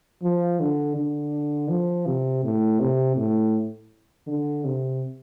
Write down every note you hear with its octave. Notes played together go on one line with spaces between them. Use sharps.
F3
D3
D3
F3
C3
A2
C3
A2
D3
C3